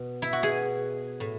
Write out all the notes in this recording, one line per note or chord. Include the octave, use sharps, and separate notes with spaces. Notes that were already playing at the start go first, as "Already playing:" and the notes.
Already playing: B2
E4
F#4
B2 G#4
A2